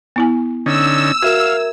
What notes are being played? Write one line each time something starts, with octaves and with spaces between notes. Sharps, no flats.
B3 E4 G#5
D3 C#4 D#4 E6
F#4 A#4 E5 F5 G#6